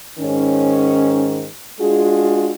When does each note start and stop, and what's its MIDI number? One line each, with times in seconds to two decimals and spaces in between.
0.19 1.45 44
0.19 1.45 51
0.19 1.45 61
1.80 2.53 56
1.80 2.53 62
1.80 2.53 65
1.80 2.53 66
1.80 2.53 68